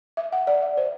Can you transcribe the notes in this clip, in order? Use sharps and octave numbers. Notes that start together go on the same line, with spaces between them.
E5
F#5
D5
E5
C5